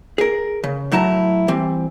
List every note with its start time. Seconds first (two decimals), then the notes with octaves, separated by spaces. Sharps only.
0.18 G#4 A#4
0.64 C#3
0.92 A2 F#3 E4 A5 A#5
1.48 E3 G3 C4